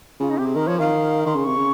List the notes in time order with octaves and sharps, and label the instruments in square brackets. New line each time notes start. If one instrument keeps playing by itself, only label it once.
[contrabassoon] C#3 [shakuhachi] F4
[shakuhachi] D#4
[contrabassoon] C3 [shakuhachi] G4
[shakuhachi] G#4
[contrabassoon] D#3 [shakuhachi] A#4
[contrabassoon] F3 [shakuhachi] C#5
[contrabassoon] D#3 [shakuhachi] F5
[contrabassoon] D#3 [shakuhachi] C6
[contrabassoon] C#3
[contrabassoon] C3 [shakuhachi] C#6
[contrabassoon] C#3